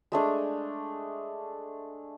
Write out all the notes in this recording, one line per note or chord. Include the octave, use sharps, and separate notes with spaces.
G#3 A3 D4 G#4